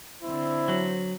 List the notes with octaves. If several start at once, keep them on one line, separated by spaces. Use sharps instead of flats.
D3 C4 E4 C5
F#3